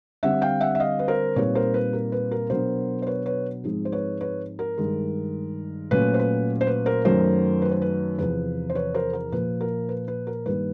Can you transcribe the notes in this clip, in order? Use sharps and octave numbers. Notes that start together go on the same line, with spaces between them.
D3 G3 C4 E5 F#5
F5 G5
E5 F#5
E5
D#5 F5
B4
A#4 C5
A#2 G3 C4 D#4 B4 C#5
A#4 C5
B4
A#4
B4
A#4
B2 F#3 B3 D4 A#4 C5
C5
B4 C#5
B4 C#5
G#2 F3 G#3 C4 D#4
C5
B4 C#5
B4 C#5
A#4
G2 D#3 G#3
A#2 F#3 A3 C#4 B4
C5
B4
C5
B4
A#4 C5
F#2 D#3 F#3 A3 A#4 C5
B4
C5
B4
E2 C3 F3 B4
C5
B4 C#5
A#4 C5
A#4
A#2 F3 A#3 B4
A#4
B4
B4
A#4
G2 D#3 G3 A#3 B4